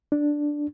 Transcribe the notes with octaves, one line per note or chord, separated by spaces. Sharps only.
D4